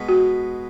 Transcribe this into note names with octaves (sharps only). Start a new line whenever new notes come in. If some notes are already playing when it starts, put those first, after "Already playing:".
Already playing: B2 G#3 B3
F#4